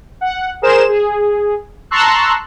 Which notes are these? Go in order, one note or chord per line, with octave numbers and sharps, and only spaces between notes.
F#5
G#4 A#4 C5 E7
G#4
A5 A#5 C6 C#6 E6 F#6